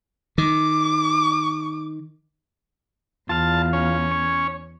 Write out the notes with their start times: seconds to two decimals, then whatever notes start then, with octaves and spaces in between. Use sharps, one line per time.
0.38 D#3 D6
3.29 E2 F4 F5 A5
3.73 C#4
4.12 C#5